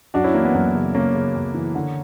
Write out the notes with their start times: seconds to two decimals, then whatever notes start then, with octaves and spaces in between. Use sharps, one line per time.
0.14 F#2 D4 F#4
0.24 C#4 E4
0.34 E3 A#3
0.45 B3
0.54 F#2 A#3
0.75 C#3
0.95 C#3 A#3 C#4
1.15 C#3
1.35 F#2
1.54 E3
1.75 D3